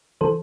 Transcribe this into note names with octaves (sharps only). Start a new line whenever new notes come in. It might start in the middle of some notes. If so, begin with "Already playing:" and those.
E3 A4 C5